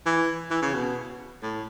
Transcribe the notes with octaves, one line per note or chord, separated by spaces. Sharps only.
E3
E3
C#3
B2
A2